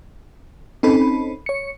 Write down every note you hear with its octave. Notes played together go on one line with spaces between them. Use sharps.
C4 C#4 D#4 A4 B5
C#5 C#7